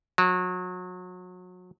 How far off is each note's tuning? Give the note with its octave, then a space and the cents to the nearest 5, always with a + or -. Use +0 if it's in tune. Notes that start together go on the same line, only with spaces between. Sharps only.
F#3 -30